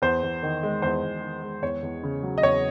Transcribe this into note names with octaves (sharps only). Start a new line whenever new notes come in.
E2 C5
E2
D#3
G#3
E2 C5
E2
D#3
G#3
E2 C#5
E2
C#3
F#3
D#5
E2 C#5